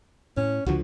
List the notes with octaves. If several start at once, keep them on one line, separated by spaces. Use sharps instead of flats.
A2 C#4
C#2 D3 F3 F#4